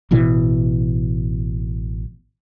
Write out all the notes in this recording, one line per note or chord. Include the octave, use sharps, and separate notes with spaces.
A1 B2 E3